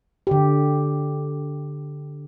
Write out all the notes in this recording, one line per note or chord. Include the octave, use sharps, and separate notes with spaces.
D3 G4